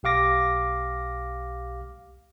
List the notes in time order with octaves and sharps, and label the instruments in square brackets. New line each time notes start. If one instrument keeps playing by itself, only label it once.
[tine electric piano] B1 G4 F5 D6 A#6